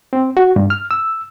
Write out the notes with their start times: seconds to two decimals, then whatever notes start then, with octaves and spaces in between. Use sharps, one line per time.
0.13 C4
0.37 F#4
0.56 G2
0.70 F6
0.91 E6